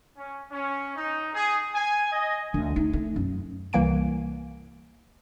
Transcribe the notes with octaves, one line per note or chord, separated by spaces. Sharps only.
C#4
C#4
D#4
G#4
G#5
D#5
D2
A3 D#4
A3
F#2
C2 E3 A#3 G#5 D7